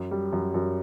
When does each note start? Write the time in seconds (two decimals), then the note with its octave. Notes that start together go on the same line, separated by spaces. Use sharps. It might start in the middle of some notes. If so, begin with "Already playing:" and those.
Already playing: F#2
0.11 G3
0.33 F#2
0.54 F#2